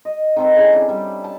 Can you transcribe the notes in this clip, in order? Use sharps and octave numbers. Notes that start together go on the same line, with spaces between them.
D#5
D#3 C4 A4
C#3 E3
D4
G3
A5